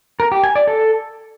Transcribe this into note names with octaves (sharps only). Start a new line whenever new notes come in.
A#4
G4
G#5
D5
A4